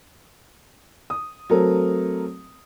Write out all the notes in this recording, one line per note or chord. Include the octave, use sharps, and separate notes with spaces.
D#6
F#3 A3 C4 A4 A#4